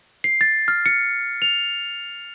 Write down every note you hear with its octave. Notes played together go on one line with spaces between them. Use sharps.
C7
A6
F6
C#7
F7